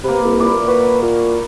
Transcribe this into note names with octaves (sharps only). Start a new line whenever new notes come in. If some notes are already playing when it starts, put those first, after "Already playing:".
C3 A#3 B4
C2
A#2 E4 D6
F#4 B4
A#2